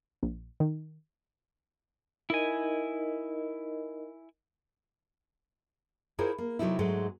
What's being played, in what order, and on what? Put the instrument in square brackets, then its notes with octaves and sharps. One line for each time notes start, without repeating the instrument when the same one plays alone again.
[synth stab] A#1
D#3
[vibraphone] D#4 A#4 D#5 [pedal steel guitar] E4 G#5
[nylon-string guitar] E4 F4 G#4 A#4 C5 C#5
A#3
C3 F#3 A3 D#4 E4
G#2 F#3 G#3 A3